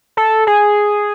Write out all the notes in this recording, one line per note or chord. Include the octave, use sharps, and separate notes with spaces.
A4
G#4